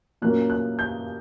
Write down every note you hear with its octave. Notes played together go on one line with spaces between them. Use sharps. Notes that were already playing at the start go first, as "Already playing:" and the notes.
A#2 F#3 A#3 C#4 F#6
F#6
G6